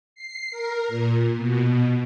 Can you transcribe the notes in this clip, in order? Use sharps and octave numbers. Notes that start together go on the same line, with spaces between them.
C7
A#4
A#2
B2